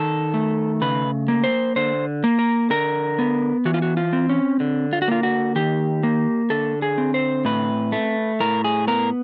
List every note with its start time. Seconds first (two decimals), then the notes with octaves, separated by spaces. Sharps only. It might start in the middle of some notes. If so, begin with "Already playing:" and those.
Already playing: D#3 A4
0.34 A3
0.81 C#3 B4
1.28 A#3
1.44 C5
1.76 D3 C5
2.24 A#3
2.39 A#4
2.70 D3 A#4
3.19 B3
3.65 E3 F#4
3.74 F4
3.82 F#4
3.97 F4
4.13 C4
4.29 C#4
4.60 D3
4.93 F4
5.02 F#4
5.08 A#3 F4
5.23 F#4
5.56 D#3 G4
6.03 A#3
6.50 D3 A4
6.82 G#4
6.98 C4
7.14 C5
7.45 A2 B4
7.92 A3
8.40 A2 A#4
8.64 G#4
8.88 B3 A#4